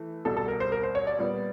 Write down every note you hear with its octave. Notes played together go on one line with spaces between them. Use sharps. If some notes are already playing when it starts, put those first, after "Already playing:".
Already playing: E3 A3
C2 B2 G3 A4
A4
A#4
C5
A#4
C5
C#5
D5
A#2 G3 B3